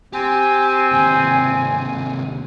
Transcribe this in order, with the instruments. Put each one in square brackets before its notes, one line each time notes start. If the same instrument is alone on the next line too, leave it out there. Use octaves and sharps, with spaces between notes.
[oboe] C4 [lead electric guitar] G4 G5 [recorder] G#5
[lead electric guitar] D#2 C3